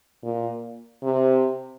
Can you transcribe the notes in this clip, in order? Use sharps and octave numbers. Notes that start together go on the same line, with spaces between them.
A#2
C3